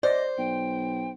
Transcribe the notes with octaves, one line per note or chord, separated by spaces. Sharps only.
C5 D5 D#5
B1 G5